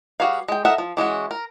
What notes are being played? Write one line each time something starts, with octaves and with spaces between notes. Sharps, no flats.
G3 F#4 G#4 B4 F5
G#3 G5
A4 A#4 D#5 E5 F#5
F3
E3 G#3 C#4 F#4
A#4